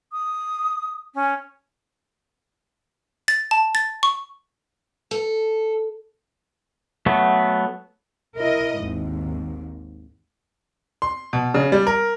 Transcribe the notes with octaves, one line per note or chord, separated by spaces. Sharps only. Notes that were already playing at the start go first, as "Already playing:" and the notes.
D#6
C#4
A6
A5
A6
C#6
A4
F#3 A3 B3
E4 A#4 D#5
G#1 D#2 G#2
C6
B2
C#3
G3
A#4